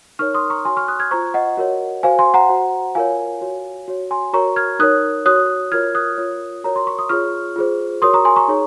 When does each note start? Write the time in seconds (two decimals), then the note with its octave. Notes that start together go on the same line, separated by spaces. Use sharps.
0.19 D#4 A#4 C#5 C#6 F6
0.34 C6 D#6
0.50 A#5 C#6
0.65 F#4 C#5 G#5 C6
0.77 C#6 F6
0.88 D#6 F#6
1.00 F6 G#6
1.11 F4 C5 A#5 C#6
1.34 D#5 F#5
1.57 F#4 A#4 C#5
2.03 F#4 C5 F5 G#5
2.19 G#5 C6
2.34 F#5 A#5
2.49 F#4 C5
2.95 F4 A#4 C#5 F5 G#5
3.41 F#4 C#5
3.88 F#4 C#5
4.11 G#5 C6
4.33 F#4 A#4 C#5 A#5 C#6
4.56 F6 G#6
4.79 D#4 A#4 C#5 D#6 F#6
5.26 F#4 C#5 D#6 F#6
5.72 F4 A#4 C#5 F6 G#6
5.95 D#6 F#6
6.18 F4 A#4 C#5
6.64 F#4 A#4 C#5 A#5
6.76 C6
6.87 C#6
6.99 D#6
7.09 F4 G#4 C#5 C#6 F6
7.56 F4 G#4 C5
8.02 F#4 A#4 C#5 C6 D#6
8.13 A#5 C#6
8.25 G#5 C6
8.36 A#5 C#6
8.48 D#4 G#4 C#5